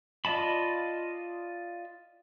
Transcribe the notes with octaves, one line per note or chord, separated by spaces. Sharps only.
F4 D5 D#5 A5 B5